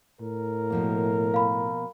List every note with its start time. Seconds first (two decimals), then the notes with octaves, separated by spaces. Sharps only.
0.21 A2 A#4
0.70 B2 F3 A#3
1.34 F5 B5